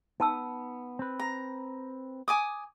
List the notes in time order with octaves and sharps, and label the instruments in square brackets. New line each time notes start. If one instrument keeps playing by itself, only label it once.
[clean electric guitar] B3 [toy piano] D#4 A5 E6
[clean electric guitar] C4 B4
[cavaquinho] A#5
G#5 D6 D#6